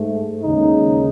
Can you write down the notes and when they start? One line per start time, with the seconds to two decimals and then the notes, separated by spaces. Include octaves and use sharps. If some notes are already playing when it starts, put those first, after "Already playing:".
Already playing: G#2 A3
0.42 D#2 C#3 G#3 D#4